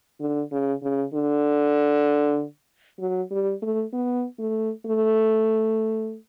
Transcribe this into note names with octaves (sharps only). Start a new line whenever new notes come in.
D3
C#3
C#3
D3
F#3
G3
A3
B3
A3
A3